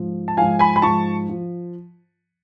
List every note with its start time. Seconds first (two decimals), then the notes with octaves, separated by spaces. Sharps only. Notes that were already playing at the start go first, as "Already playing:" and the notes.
Already playing: G#2 F3
0.28 A5
0.37 G#2 F3 F5 G#5
0.59 G#5 B5
0.76 B5
0.82 G#2 F3 A5 C#6
1.29 F3